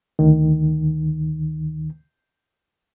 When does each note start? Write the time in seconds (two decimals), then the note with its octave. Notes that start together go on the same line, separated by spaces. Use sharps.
0.19 D2 D#3